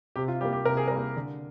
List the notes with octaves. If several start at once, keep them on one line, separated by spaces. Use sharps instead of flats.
C3 G4
F4
G3 A#3 G4
G4
C3 A#4
G#4
G3 A#4
A#3
D3